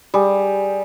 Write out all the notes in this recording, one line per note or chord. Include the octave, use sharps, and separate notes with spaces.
G3 G#4